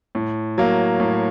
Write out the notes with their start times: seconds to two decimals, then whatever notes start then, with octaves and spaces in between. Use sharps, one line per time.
0.15 A2
0.58 F#3 A#3
1.00 A2